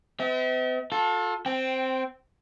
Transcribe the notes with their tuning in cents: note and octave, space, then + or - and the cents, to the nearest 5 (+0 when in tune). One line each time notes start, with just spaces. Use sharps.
C4 -45 E5 -45
F4 +40 A4 +0
C4 +0 G5 -15